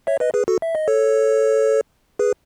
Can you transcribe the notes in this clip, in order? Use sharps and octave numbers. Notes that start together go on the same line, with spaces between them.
C#5 E5
B4 D#5
G#4 B4
F#4 A4
E5
D#5
A4 C#5
G#4 B4